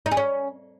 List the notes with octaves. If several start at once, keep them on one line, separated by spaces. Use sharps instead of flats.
D#4
G#4
C#4